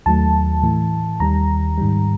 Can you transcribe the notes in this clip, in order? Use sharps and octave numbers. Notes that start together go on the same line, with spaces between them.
D#2 D#3 F#3 A3 A5
A2 E3 A3
D#2 D#3 G3 A#5
G#2 D#3 G3